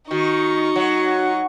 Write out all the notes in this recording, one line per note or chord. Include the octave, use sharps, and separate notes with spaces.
D#3 D#4 F#4 C#6
F#3